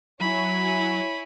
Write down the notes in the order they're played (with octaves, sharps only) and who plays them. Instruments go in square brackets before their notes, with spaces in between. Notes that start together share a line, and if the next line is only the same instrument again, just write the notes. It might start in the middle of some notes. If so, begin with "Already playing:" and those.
[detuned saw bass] F#3 [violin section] E4 C#5 G#5 [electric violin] B5